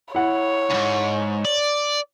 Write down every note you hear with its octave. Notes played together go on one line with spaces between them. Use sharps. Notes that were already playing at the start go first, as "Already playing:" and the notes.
E4 C#5 F#5
D2 G#2
D5